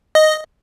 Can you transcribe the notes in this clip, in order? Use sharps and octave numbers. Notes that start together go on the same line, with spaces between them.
D#5